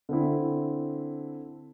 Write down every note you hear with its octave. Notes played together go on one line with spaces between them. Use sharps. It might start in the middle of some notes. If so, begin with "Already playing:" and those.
D3 C4 E4